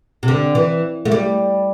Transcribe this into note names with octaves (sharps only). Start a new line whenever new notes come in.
C3
D3
E3
A3
G3